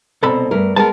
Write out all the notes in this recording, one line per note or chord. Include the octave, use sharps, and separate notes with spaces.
C2 B2 C4 A4 B5
G2 A3 A#4
G#3 B3 A#4 A5